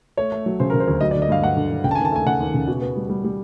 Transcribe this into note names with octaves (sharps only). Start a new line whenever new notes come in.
A3 C#5
A3
F#3
C#3 C5
A#4
C#3
C5
D2
F#3 D#5
D5
D3
D#5
G2 F5
G2 F#5
D3
D3
C#3 G5
A5
G#5
D#2
A5
A3 G#5
C#3 F#5
D#2
C#3
B2
B3
G3
G3
G3